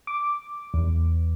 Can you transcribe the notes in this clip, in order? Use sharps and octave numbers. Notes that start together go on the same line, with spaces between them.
D6
E2